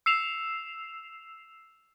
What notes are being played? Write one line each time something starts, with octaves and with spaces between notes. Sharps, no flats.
E6 C7 E7 F7